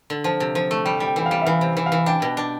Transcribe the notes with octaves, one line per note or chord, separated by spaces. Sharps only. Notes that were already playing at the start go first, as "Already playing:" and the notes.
D3
F3 A5
C3
F3
A3
G3 G5
G3 G5
E3 G5
F5
G3
E5
E3 F5
C3
E3
F5
E3
D4 G5
B2
D4